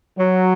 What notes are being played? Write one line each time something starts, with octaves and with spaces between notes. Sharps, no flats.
F#3